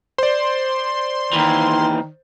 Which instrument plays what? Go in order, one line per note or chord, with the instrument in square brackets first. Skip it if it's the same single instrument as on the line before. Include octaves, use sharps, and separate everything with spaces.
[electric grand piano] C5 D5 [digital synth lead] C6
[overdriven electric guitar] D#2 E3 [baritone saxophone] D#3